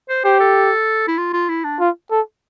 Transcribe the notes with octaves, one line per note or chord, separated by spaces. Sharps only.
C5
G4 C5
A4
E4
F4
F4
E4
D4
F4
A4